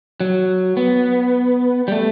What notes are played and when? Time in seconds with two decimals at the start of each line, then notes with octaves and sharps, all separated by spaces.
0.20 F#3
0.77 B3
1.88 G3
1.92 A3